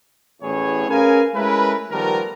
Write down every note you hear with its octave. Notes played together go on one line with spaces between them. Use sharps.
A1 E2 A2 E3 G#4 C#5
C#4 G#4 A#4 B4 F5 G#5
G#3 A3 C#4 E4 A#4 B4
D#3 F3 G3 A3 B3 A#4